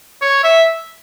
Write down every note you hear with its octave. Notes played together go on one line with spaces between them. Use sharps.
C#5
E5